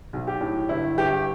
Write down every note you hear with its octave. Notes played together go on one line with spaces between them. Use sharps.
B1
G4
A2
G1 E4
G1 G4